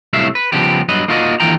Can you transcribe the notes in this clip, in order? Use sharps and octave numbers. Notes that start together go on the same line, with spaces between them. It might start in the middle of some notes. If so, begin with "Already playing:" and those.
C2 A2 F#3 E5 F5
B4
C#3 F3 G3 B3 G4
G2 F#3 B4 D#5
A#3 D#4 F4 F#4 D5 D#5
D#2 D3 E3 F4 G5 A#5